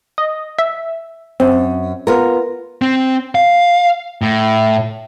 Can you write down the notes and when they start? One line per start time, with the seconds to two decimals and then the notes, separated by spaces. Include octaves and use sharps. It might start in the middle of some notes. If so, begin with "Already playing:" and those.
0.18 D#5
0.59 E5
1.40 F#2 C4
2.07 B3 F4 A#4
2.82 C4
3.35 F5
4.22 A2